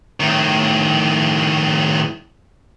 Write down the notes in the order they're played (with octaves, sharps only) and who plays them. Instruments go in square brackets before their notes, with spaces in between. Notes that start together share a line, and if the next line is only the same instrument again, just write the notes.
[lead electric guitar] A2 D#3